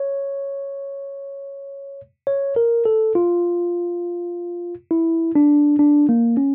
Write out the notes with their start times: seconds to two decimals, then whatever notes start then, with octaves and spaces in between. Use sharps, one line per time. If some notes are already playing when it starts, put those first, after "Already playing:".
Already playing: C#5
2.27 C#5
2.56 A#4
2.85 A4
3.15 F4
4.91 E4
5.35 D4
5.79 D4
6.09 A#3
6.37 C#4